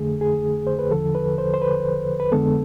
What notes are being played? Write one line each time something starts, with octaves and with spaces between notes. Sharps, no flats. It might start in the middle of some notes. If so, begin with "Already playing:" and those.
Already playing: F2 D3 A3 G#4
G#4
C5
B4
E2 D3 F3 A4
B4
C5
C5
B4
B4
F2 D3 G#3 B3 A4